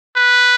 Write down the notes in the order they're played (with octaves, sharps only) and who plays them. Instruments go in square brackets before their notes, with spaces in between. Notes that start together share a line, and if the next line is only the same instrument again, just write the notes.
[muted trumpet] B4